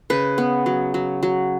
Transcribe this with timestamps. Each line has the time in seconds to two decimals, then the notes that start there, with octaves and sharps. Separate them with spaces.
0.10 C#3 B4
0.38 B3
0.66 F#3
0.94 F#3
1.23 F#3